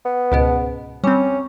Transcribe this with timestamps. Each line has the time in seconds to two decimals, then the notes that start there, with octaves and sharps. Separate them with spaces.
0.05 B3
0.32 C#2 G#2 B2
1.04 G3 C4 C#4